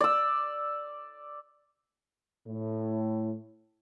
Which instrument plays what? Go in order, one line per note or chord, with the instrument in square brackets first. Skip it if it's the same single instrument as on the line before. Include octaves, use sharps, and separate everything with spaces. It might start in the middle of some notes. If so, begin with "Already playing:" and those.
[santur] D5 E6
[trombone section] A2